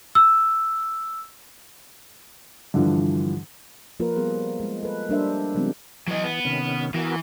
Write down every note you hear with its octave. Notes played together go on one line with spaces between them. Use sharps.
E6
G2 D3 E3 F3
F3 A#3 F4 A#4 B4
F3 G3 B3 G#4
G#3
A4 B4
G3 A#3 D4 A#4 C5 E5
C#3 F3 G3 G#3 B3 C4
E3 F#3 D#5
B3
C3 D#3 C#4
E3 B3 F#4 A#4